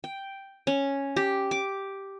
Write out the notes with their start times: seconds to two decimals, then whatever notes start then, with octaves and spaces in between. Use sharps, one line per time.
0.04 G5
0.67 C#4
1.16 G4
1.51 D6